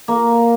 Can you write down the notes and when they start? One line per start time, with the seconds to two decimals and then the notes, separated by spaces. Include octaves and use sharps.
0.08 A#3